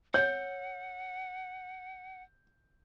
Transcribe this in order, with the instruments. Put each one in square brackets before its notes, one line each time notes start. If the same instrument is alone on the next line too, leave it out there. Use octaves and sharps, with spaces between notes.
[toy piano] C#5 [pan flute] F#5 [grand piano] G6